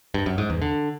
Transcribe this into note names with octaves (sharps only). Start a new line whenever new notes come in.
G2
F#2
G#2
E2
D3